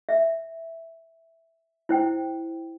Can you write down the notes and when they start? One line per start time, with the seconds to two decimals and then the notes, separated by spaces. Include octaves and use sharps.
0.09 E5
1.89 E4 C5 G5